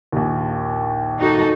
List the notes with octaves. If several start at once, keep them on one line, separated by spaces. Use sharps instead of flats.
A#1 D#2
D#4 F#4 A4